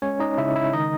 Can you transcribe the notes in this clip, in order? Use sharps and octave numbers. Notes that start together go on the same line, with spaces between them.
G#3 C#4 C#5
D#4 D#5
C#3 E4 E5
E4 E5
D#3 D#4 D#5